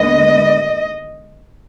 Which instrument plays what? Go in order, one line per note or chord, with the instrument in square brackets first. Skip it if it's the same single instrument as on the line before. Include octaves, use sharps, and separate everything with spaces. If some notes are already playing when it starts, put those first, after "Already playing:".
Already playing: [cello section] D#2 D3 G#3 B3 D#5